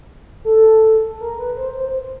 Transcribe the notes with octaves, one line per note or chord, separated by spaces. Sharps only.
A4
A#4
B4
C5
C5